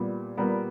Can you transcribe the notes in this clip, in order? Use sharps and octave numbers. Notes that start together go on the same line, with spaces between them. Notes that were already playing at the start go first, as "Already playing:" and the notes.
Already playing: A#2 G3 B3
A#2 G3 B3 A#4